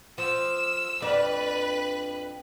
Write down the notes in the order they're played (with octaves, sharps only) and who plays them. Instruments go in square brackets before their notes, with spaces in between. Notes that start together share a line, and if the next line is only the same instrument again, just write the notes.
[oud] F3 [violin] E6
[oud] F2 D4 D5 [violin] B4